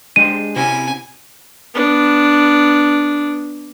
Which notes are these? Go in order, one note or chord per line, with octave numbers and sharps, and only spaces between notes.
G#3 D4 G4 C5 D#7
C3 C#4 E4 F#4 G#5
B3 D4